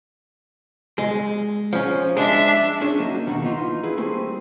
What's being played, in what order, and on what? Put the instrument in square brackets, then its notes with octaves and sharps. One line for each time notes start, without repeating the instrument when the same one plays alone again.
[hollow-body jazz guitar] G#3
F3 C#4
[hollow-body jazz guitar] G#3 [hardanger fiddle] D4 E5
[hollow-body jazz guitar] C#4 D4 G#4 C#5
F#3 A#3 D#4 F#4
D#2 B2 D#3 A#3 F#4
E3 D#4 F4
E4 G#4 B4
G3 A3 A#3 C4 G#4